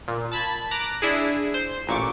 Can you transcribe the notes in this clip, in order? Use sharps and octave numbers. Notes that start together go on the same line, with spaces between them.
A#2
A5 B5 G#6
A#5 D6 F#6
D4 E4 G#4
C5
A1 A#2 C#6 D6